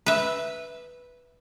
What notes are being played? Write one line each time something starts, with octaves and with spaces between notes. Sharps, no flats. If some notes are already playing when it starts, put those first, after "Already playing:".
B4 E5